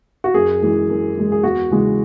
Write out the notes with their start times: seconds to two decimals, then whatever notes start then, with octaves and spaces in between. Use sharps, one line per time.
0.24 F#4
0.34 F#2 G#4
0.62 E3 G#3
0.89 F#2
1.16 E3 G#3
1.32 G#4
1.43 E2 F#4
1.71 C#3 E3 G#3